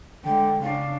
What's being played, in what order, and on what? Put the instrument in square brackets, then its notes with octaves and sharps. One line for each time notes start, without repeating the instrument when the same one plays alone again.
[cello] D3 G#3 [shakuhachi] G5
[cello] C#3 D4 [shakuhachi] F5